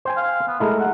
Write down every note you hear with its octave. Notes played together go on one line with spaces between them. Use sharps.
C5 G5 G#5
F5
B3
G#3 A3 E4 A#4
F#5